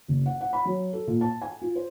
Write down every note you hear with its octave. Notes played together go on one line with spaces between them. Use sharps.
F#1
F#5
F#5
B5
F#3
A4
A#2
A5
G#5
F4
C5